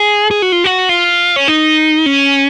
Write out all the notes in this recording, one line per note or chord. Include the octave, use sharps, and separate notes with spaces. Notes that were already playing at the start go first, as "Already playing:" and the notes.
Already playing: G#4
G#4
F#4
F4
F#4
F4
C#4
D#4
C#4